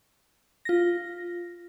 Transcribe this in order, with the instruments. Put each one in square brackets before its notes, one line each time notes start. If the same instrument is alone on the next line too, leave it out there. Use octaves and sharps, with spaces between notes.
[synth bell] F4 A#6